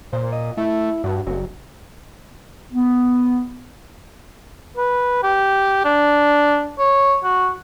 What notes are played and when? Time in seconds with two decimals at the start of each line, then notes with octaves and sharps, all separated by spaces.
0.13 A#2 C5
0.32 D#5
0.57 A3 E4
1.04 G2 F#4
1.27 F#1 F#3
2.72 B3
4.77 B4
5.23 G4
5.85 D4
6.79 C#5
7.24 F#4